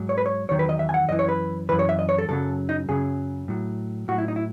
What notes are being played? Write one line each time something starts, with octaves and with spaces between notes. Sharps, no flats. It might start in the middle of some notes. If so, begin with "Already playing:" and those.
Already playing: G#2 F#3
C#5
B4
C#5
E2 D#3 F#3 C#5
B4
D#5
E5
G#5
F#5
F#2 E3 D#5
C#5
B4
F#2 E3 B4
C#5
E5
D#5
C#5
A4
F#2 C#3 F#3 A4
D#4
F#2 C#3 F#3 G#4
A2 F#3
A2 F#3 F#4
E4
D#4
E4